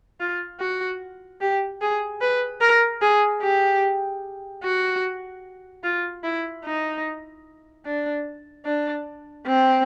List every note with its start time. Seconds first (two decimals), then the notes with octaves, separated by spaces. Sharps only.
0.20 F4
0.60 F#4
1.41 G4
1.81 G#4
2.21 B4
2.61 A#4
3.02 G#4
3.42 G4
4.63 F#4
5.84 F4
6.24 E4
6.65 D#4
7.86 D4
8.65 D4
9.47 C4